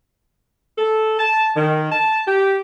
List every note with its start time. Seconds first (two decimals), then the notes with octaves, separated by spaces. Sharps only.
0.78 A4
1.19 A5
1.57 D#3
1.92 A5
2.28 G4